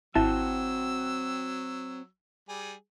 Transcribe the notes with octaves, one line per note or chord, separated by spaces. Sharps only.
G#1 F#3 C4 E4 F#4 G5 A5 E6
G3 G#4